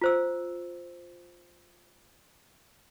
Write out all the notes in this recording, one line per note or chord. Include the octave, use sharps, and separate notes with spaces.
F4 C5 E6